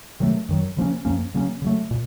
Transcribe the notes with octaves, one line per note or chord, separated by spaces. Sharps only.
C3 D#3 F#3 A3
F#2 D#3 F#3
C#3 F3 A#3 C#4
F#2 F3 A#3 C#4
C#3 F#3 A#3 C#4
C#3 F#3 A3
A#2